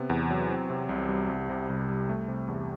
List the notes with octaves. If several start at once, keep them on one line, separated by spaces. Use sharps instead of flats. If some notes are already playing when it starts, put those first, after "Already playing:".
Already playing: C3 B3
E2
F#3
C4
C3
C2
G3
C2
C3
C2
G3
A3
C3
E2